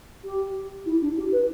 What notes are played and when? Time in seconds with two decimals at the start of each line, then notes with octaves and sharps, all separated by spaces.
0.24 G4
0.86 E4
1.01 D4
1.17 G4
1.32 B4